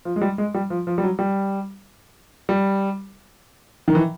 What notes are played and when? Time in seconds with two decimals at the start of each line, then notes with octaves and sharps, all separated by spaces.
0.05 F3
0.16 G#3
0.22 G3
0.38 G#3
0.54 G3
0.70 F3
0.87 F3
0.98 G3
1.03 F#3
1.19 G3
2.49 G3
3.88 D#3
3.95 E3